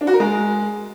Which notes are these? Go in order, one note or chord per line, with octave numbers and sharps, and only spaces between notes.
D4
F#4
A#4
G#3